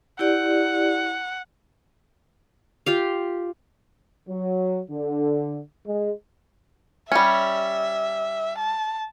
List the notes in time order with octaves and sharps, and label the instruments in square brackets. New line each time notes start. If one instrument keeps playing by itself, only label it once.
[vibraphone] E4 G4 D5 [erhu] F#5
[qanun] F4 G4 F5
[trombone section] F#3
D3
G#3
[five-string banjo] G3 C#4 [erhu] E5
[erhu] A5